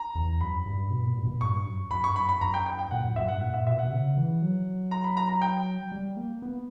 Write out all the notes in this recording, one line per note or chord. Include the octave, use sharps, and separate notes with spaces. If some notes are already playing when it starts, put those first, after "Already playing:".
Already playing: A#5
E2
F#2 B5
G2
B2
A#2
G2
B2
A#2
G2 C#6
F#2
F#2 B5
G2 C#6
F#2 B5
B5
F#2 A#5
G5
G5
G5
A#2 F#5
F#2
F#2 E5
G2 F#5
A#2 F#5
E5
B2 E5
B2 F#5
C#3
E3
F#3
A#5
B5
A#5
A#5
G5
G3
A#3
B3